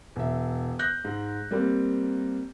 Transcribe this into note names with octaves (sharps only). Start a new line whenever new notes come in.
E1 E5
F#6 G6 A#6
G#2
G3 A#3 C4